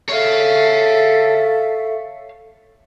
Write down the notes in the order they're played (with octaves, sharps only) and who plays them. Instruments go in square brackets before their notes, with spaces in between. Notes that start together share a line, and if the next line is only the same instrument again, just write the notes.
[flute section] A4 E5 [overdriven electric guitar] C#5 F5